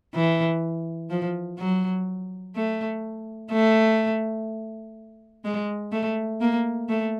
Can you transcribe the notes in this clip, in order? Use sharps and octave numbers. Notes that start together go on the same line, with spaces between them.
E3
F3
F#3
A3
A3
G#3
A3
A#3
A3